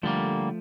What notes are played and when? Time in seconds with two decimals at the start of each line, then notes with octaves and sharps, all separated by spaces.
0.03 D3 F3 G3 A3 A#3